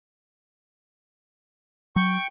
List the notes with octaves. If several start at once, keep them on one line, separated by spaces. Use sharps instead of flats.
F#3 G5 C#6